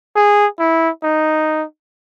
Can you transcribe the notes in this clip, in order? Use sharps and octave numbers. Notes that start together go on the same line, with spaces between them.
G#4
E4
D#4